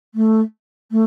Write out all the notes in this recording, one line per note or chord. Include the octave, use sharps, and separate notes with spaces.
A3
A3